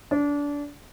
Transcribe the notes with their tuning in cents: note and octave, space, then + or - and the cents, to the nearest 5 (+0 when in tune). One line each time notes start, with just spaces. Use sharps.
D4 -25